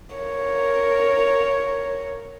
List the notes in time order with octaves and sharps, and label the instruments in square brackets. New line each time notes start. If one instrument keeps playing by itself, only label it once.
[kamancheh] A#4 C#5